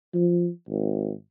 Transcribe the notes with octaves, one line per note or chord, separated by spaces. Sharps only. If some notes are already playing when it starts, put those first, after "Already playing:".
F3
G#1